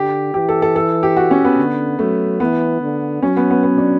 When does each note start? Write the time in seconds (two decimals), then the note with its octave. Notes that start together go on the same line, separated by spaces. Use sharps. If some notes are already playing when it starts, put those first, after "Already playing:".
Already playing: D3 G4
0.34 E3 G4
0.49 A4
0.62 A4
0.76 A4
1.03 G4
1.17 F#4
1.31 C#4
1.45 B3
1.58 D3
1.99 F#3 A3
2.40 E3 B3
2.81 D3
3.22 F#3 C#4
3.37 B3
3.50 B3
3.63 B3
3.78 D4